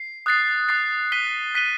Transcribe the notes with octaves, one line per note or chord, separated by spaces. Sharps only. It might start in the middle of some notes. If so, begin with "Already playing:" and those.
Already playing: C7
D#6 F#6 A6 C7
D#6 F#6 A6 C7
F#6 B6 D#7 G7
F#6 B6 D#7 G7